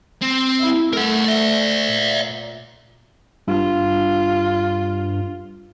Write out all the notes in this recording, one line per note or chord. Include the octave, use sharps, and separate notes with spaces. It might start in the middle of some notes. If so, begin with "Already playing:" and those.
C4
E4
A3 A#4 F#5
D5 E5
A#2
G2 F4